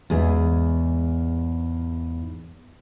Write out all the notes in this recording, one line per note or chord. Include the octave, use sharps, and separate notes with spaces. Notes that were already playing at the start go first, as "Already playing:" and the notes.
E2 G#2 G#4